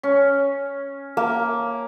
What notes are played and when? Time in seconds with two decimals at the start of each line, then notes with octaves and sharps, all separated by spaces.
0.03 C#4
1.17 A#3